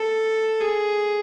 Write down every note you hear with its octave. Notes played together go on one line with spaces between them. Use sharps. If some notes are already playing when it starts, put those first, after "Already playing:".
Already playing: A4
G#4